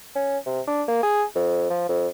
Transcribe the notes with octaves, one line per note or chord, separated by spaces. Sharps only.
C#4
C3
D4
A#3
G#4
F2
F3
F2